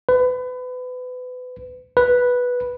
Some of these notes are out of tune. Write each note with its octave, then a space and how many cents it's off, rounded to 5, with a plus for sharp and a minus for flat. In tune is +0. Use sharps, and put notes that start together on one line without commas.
B4 +30
B4 -5